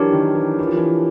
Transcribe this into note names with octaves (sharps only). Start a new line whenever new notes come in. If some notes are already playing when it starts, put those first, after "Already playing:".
Already playing: E3 F#3 D4 G4 A#4 C#5
D#3
E3
E3
F3
E3